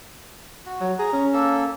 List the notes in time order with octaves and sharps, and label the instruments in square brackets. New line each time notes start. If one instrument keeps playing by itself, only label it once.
[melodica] F#4
[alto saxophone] F#3
[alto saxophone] G#4 [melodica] A#5
[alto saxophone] C#4
[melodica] A#3 A4 E6